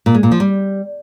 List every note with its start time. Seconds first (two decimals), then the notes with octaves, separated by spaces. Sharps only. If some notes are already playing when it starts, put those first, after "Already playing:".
0.06 A#2
0.15 G#3
0.23 A#2
0.31 F3
0.40 G3